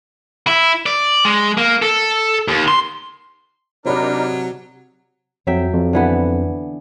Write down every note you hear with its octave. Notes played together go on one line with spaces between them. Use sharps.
E4
D5
G#3
A#3
A4
D#2
C6
C3 F#3 D4 D#4 A#4 C#5 B5
F2 F#3 E5 G5
F2
D3 E3 B3